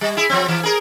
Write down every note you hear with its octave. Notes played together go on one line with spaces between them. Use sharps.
G3
E4 G#4
F3 C4
E3
G#4 A#4